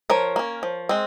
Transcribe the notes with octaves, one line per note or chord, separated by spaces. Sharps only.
F3 A#4 C#5
A#3 C#4
F3
G#3 C4